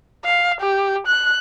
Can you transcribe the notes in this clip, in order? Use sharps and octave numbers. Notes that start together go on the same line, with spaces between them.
F5
G4
F#6